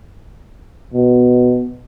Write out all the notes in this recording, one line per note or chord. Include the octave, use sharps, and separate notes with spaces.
B2